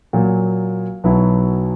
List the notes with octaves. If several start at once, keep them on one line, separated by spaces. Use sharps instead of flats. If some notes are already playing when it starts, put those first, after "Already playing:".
A#2 F#3 A#3
B1 B2 F#3 B3 E4